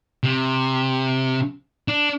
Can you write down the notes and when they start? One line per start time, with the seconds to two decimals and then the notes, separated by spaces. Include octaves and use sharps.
0.24 C3
1.88 D4